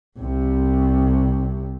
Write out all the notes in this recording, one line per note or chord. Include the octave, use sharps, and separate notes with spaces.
C2 C3